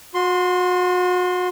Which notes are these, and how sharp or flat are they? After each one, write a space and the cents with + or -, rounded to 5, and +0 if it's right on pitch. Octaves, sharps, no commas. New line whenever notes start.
F#4 -35 C6 +5